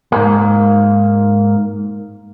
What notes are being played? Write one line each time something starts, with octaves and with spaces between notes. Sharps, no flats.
G#2 A#3